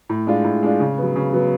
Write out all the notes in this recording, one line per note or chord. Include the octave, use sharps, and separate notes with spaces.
A2
G#3 D4 F4
A2
G#3 D4 F4
C#3
F#3 B3
C#3
F#3 B3